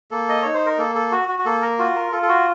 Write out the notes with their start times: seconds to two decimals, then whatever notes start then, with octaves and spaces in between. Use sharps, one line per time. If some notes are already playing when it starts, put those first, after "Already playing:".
0.11 A#3 A4
0.29 D#5
0.42 D#4 C#5
0.54 C5
0.66 A#4
0.78 A#3 A4
0.95 A4
1.12 F#4
1.28 F#4
1.39 F#4
1.45 A#3 A4
1.62 A#4
1.79 F4 F#4
1.95 A#4
2.12 F4 A4
2.22 A4
2.29 F#4